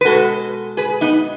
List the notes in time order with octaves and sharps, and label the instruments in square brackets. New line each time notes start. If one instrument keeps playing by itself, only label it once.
[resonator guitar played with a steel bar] B4
B2 G#3 F#4 A4
G#4 B4
B3 D#4